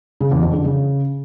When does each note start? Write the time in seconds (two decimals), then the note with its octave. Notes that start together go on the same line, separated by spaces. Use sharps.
0.21 C#3
0.31 E2
0.42 F2
0.53 D3
0.64 C#3